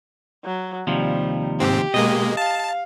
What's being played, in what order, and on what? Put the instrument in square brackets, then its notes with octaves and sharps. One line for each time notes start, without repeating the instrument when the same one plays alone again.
[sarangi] F#3
[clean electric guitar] D#2 C3 F3 [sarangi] G3
[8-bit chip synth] G#2 C4 [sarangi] G4
[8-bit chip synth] B2 G#3 A#3 [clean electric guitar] D#5
[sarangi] F5 [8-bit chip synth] A5